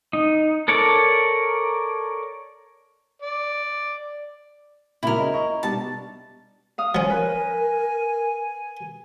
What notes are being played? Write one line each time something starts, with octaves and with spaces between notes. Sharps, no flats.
D#4
A4 A#4 C#5 D5 A5
D5
A#2 C#3 F#3 E4 A#4
D#5
D#5 C#6
B2 G3 D4 A5
F5 D#6
F3 C#4 G#5
A#4 B4